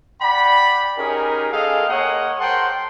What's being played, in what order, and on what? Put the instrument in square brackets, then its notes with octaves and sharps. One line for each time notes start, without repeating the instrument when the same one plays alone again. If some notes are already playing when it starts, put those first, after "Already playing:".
[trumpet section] D5 F#5 G5 B5
C#4 D#4 G4 G#4 A#4
G#3 G#4 A4 D#5 F5 G5
G#3 A#3 A#4 C#5 D#5 F#5
A#4 C5 F#5 G5 A5 C6